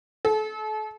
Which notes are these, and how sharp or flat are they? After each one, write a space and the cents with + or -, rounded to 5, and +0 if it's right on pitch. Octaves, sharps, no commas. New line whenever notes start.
A4 -35